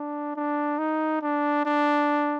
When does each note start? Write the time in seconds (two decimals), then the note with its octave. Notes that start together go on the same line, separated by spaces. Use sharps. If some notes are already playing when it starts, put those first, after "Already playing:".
Already playing: D4
0.36 D4
0.79 D#4
1.22 D4
1.66 D4